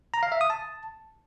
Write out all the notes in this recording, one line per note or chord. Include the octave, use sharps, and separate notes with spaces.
A#5
F5
E5
D#6
A5